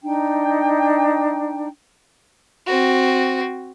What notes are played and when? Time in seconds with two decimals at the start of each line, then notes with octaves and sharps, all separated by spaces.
0.02 D4 D#4 G5
2.67 C4 F#4